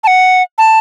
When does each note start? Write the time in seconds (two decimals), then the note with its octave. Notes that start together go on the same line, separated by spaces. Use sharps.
0.04 A5
0.07 F#5
0.58 A5